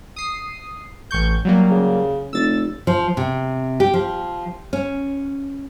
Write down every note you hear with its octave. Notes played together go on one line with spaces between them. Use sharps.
D#6 C7
A1 C#6 G6
F#3 G3 A#3
C#3
F1 E6 A6
F3
C3
G4
F3
C#4